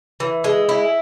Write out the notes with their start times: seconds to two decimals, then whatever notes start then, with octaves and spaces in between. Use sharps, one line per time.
0.20 E3
0.44 G#3
0.69 E4